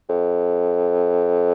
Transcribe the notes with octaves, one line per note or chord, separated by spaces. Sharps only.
F2